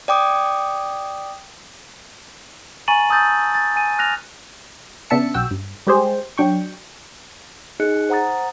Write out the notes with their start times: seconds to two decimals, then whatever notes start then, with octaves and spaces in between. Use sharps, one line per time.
0.08 D5 G5 D6 D#6
2.88 G#5 A#5 C#6 A6 D#7 F#7
3.10 A5 D#6 E6 G6 A6
3.55 A6
3.76 G#5 D#7
3.98 F6 F#6 A#6 F7
5.10 C#3 B3 D4 E5 A5 C#7
5.34 B1 F#4 G5 E6
5.51 G2
5.87 G3 G#3 G4 G#4 C5
6.38 F#3 D4 G5 C#6
7.80 D#4 G#4 D#5 F#6 C#7
8.09 C5 F#5 A#5 D#6 A6